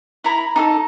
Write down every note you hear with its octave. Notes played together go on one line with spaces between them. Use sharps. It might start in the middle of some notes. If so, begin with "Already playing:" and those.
E4 A#5 B5
D#4 G4 A4